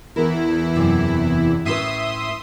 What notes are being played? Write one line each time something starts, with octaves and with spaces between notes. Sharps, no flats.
E2 E4 A#4
F#2 C3
A2 C#4 B4 E5 C6 D#6